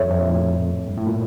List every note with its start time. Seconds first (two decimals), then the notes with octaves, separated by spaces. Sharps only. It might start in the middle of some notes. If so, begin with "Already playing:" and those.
Already playing: F2 A4 C#5 E5
0.11 F2
0.21 A#2
0.31 A2
0.88 G2
0.98 A2
1.07 A#2